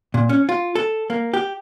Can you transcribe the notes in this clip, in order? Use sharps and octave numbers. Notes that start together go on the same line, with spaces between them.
A#2
C#4
F4
A4
A#3
G4